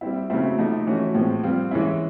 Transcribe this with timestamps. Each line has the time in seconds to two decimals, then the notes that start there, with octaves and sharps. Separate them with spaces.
0.01 G3 C4 E4
0.30 C#3 F#3 A3 C4 E4
0.58 C3 F3 A3 C4 D#4
0.87 E3 A3 C#4 F#4
1.14 A2 F3 G#3 C4
1.43 G3 C4 F4
1.71 E3 G#3 C#4 E4